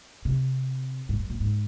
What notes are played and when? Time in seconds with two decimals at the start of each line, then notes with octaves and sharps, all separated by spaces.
0.25 C3
1.09 G#2
1.19 F#2
1.30 A#2
1.40 G#2